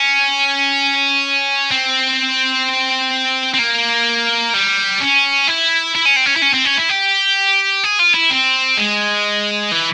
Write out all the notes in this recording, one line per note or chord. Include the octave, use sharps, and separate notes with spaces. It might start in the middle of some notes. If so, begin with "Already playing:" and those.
Already playing: C#4
C4
C4
A#3
G3
C#4
E4
E4
C#4
C4
C#4
E4
C#4
C4
C#4
E4
G4
G#4
F4
E4
C4
G#3
E3